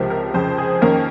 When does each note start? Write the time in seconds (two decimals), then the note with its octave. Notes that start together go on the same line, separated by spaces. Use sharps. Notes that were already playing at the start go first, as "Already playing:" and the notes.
Already playing: C#2 C3 F3 A#4
0.10 A#4
0.34 F2 C#3 F3 C5
0.58 G#4
0.81 F2 D#3 A#3 C#4 A#4